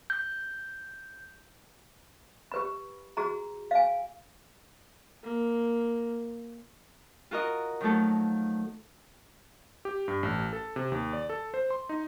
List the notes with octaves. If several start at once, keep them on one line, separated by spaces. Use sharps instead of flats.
G6
G4 B4 B5
F#4 G#4 A#5
F5 G#5
A#3
F4 F#4 A#4 D#5
D#3 F3 F#3 A3 A4
G4
G2
A1
A4
C3
D#2
D5
A4
C5
C6
D#4